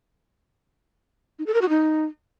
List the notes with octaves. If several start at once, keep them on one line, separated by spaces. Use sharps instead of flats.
D#4
A4
A#4
F#4
D#4